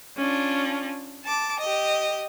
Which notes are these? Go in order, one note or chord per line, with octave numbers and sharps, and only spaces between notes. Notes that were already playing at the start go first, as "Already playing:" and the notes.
C#4 D4 F4
A5 D6
G4 D#5